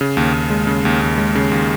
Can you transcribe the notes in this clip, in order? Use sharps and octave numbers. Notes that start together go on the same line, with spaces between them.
C#3
D#2
D#2
G#3
C#3
D#2
D#2
G#3
C#3
D#2